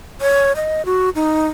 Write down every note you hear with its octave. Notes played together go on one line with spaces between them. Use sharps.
C#5
D#5
F#4
D#4